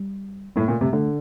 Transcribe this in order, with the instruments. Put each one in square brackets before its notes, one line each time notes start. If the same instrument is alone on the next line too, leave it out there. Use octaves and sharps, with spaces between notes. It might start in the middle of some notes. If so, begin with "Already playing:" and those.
Already playing: [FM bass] G3
[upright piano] A2 [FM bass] A#3
[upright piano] A#2 [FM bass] A3
[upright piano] C3 [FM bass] A3
[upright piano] D3 [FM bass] A3